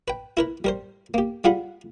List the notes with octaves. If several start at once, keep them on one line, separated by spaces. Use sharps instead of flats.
B4 G5
E4 A#4 B4
G3 A#4 C5
A#3 G4
G3 F4 G#4 F5 F#5 B5